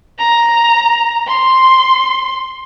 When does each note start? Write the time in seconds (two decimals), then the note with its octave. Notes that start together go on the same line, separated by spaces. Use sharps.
0.19 A#5
1.28 C6